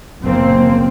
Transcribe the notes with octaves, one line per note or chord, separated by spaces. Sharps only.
F#1 F#2 A#2 F3 A#3 C4